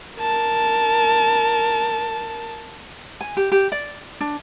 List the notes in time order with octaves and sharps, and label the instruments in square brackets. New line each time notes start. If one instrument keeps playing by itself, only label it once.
[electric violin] A#4 A5
[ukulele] G#5
G4
G4
D5
D4